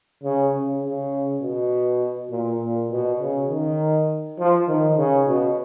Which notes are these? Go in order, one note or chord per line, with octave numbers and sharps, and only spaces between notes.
C#3
C#3
C#3
B2
A#2
A#2
B2
C#3
D#3
F3
D#3
C#3
B2